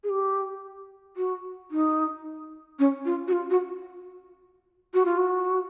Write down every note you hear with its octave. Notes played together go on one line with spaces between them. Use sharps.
G#4
G4
F#4
D#4
C#4
F4
F#4
F4
F#4
F#4
F4
F#4